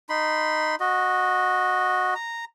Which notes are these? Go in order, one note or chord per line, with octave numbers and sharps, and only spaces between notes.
D#4 B5 C6
F#4 D#5
A#5